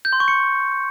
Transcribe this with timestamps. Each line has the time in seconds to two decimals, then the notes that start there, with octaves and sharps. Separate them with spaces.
0.05 G6
0.13 C6
0.20 C#6
0.28 C#7